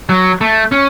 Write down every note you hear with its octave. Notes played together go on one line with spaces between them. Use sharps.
F#3
A3
C#4